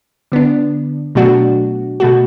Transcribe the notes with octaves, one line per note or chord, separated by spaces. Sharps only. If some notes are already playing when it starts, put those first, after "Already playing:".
D3 B3 D4
B2 F#3 A3 D4 F#4
B2 A3 F#4